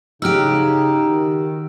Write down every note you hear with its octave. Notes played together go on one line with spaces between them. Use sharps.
C#3 D#4 F#4 G4 E6 F6 D7
D#3